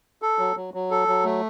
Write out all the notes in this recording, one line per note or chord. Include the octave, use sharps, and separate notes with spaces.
A4
F#3
F#3
F#3
A4
F#3
A3